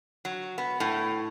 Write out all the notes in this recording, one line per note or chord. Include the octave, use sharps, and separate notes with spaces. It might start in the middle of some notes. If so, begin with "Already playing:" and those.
F#3
B3
A2